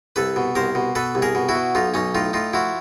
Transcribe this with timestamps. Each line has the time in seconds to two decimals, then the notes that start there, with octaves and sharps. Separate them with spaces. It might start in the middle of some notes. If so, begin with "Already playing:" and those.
0.16 C2 A4 B4
0.36 B2
0.55 C2 A#4 C5
0.75 B2
0.95 B2 A4 B4
1.15 C2
1.22 G#4 A#4
1.35 B2
1.49 E4 F#4
1.55 B2
1.75 B1 D#4 F4
1.94 B1 C#4 D#4
2.15 A2 D#4 F4
2.33 A2 D#4 F4
2.53 F3 E4 F#4